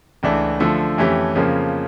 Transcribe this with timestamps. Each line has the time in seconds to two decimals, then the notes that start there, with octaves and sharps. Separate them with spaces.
0.23 C#2 C#3 E3 A3 D4
0.60 D3 F3 A3
0.98 F2 E3 A3 C#4 G4
1.35 F2 C#3 F3 A#3